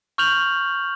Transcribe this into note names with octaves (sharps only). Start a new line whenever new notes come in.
C#6 F6 G6 F7 F#7